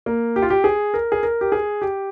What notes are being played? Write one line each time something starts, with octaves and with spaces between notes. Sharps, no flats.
A#3
G4
F4
G4
G#4
A#4
G#4
A#4
G4
G#4
G4